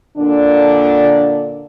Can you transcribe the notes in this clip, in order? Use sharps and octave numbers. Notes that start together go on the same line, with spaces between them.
A#2 D3 D4